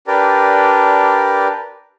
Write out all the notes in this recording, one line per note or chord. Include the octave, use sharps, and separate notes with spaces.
D4 G4 A#4 B4 D5